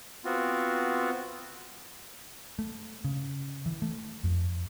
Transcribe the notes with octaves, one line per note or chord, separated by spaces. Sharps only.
B3 C4 F4 F#4
A3
C#3
E3
A3
F2